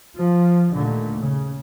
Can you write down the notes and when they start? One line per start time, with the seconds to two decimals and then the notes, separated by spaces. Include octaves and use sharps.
0.16 F3
0.71 D#2 A#2 D3 A3
1.20 C#3